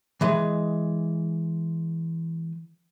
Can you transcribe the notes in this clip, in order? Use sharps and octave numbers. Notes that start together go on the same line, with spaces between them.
E3 G#3 D#5